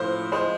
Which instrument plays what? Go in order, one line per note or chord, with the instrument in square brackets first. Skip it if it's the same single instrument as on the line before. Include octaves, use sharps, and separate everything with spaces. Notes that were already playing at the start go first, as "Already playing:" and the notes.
Already playing: [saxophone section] A2 F3 [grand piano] C5
[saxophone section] G#3 [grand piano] C5